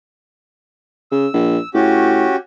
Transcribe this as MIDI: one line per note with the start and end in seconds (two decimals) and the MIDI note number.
1.12 1.27 49
1.12 1.69 88
1.33 1.58 34
1.74 2.27 45
1.74 2.36 61
1.74 2.36 66
1.74 2.36 67